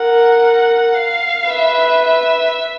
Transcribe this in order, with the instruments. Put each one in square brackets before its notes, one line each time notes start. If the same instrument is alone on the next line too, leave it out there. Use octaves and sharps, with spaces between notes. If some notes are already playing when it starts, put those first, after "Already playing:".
Already playing: [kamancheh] A#4 [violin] F#5
[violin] F5
[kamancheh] B4 [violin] E5
[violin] E5